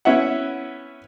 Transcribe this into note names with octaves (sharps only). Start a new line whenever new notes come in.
B3 C#4 E4 E5 F#5